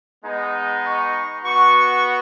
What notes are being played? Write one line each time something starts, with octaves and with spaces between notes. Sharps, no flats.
G#3 B3 D#4
C#6
B3 F#4 C#6